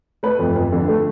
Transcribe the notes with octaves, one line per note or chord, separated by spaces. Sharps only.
A3 B4
F2
F2
D3
A3